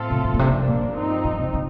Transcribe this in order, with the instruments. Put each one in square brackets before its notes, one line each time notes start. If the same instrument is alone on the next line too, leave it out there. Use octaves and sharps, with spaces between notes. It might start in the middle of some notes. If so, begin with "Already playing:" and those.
Already playing: [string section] A2 A3 C4 F4 A4
[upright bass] C3
D3
A#2
[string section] G2 F3 A#3 D4 [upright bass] C3
[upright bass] A#2
[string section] G2 F3 C4 D#4
[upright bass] A#2
C3
D3